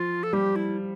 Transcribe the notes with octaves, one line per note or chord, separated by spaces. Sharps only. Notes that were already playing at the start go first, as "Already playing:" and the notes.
Already playing: F3 F4
A4
G3 G4
E4